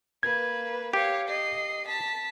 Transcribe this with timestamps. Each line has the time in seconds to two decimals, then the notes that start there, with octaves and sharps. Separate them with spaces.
0.23 A#3 B4 G#6
0.93 G4 C#5 F5
1.28 D#5 C7
1.87 A5 B6